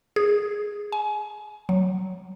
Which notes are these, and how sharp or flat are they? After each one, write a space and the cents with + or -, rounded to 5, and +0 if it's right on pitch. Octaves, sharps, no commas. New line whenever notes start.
G#4 -5
G#5 +30
F#3 +10